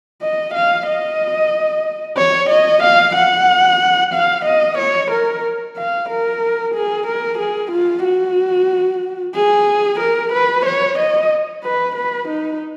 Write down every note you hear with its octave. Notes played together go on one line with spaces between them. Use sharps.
D#5
F5
D#5
C#5
D#5
F5
F#5
F5
D#5
C#5
A#4
F5
A#4
G#4
A#4
G#4
F4
F#4
G#4
A#4
B4
C#5
D#5
B4
B4
D#4